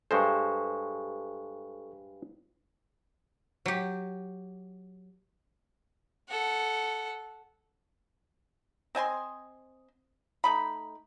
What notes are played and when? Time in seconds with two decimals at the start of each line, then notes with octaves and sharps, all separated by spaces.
0.11 G2 G#3 A4 C5 C#6
3.66 F#3 G4
6.29 A4 F#5
8.95 C4 D#5 G#5 C6
10.44 A3 D#4 B5